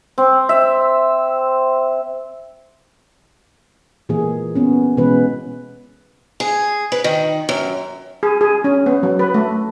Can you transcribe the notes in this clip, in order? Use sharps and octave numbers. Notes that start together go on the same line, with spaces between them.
C4
E5
A#2 E3 A#3 G#4
B3 C#4
B2 E3 G#3 B3 C#4 B4
G#4
B4
D#3
F#2
G#4
G#4
C#4
B3
F#3
B4
A3